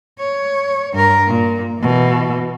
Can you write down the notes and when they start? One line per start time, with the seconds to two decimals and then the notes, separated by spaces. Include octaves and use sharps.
0.19 C#5
0.93 G2 A#4
1.27 A#2
1.80 B2 E3